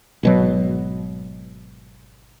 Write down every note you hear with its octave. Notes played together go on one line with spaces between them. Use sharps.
G#1 B2 F#3